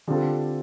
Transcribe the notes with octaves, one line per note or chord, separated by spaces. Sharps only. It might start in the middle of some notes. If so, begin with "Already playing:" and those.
D3 G3 C4 F4 A4